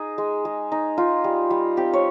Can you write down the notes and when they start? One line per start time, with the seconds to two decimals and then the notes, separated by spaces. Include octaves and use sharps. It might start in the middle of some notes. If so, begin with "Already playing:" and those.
Already playing: D#4 G#4
0.18 G#3
0.45 G#3
0.72 D#4
0.98 D#4 F4
1.24 G3
1.50 G3
1.77 C4 G4
1.93 C#5